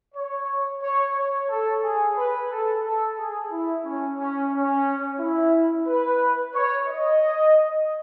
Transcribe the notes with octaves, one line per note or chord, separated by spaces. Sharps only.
C#5
C#5
C#5
A4
G#4
B4
A4
A4
G#4
E4
C#4
C#4
C#4
E4
B4
C#5
D#5